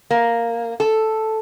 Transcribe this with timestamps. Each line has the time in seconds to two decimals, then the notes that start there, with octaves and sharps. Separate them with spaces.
0.11 A#3
0.80 A4